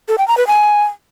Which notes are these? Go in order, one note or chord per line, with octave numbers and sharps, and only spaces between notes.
A4
G5
A#5
B4
G#5